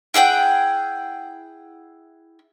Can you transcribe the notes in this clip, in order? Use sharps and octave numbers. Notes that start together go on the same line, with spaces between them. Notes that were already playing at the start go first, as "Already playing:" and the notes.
E4 G#4 F#5 G5